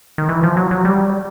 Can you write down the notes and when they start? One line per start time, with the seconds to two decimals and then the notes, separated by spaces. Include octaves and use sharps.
0.18 D#3
0.29 E3
0.43 F3
0.57 F#3
0.71 F#3
0.85 G3